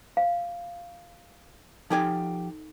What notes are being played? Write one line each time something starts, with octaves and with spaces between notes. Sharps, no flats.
F5
F3 D#4 G4 A4 G#5